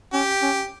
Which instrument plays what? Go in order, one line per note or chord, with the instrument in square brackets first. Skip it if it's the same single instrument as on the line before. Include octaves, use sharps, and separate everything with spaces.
[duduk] C#4 [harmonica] G4
[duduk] C#4